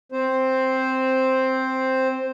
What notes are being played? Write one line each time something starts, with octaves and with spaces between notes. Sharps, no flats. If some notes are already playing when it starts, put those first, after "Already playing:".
C4 C5